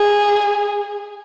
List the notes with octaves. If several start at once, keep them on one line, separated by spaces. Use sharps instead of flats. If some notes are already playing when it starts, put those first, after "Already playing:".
Already playing: G#4